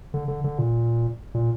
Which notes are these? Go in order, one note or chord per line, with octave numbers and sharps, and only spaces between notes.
D3
D3
D3
A#2
A#2